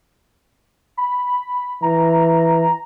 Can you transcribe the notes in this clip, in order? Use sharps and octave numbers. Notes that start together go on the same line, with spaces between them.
B5
E3 A#5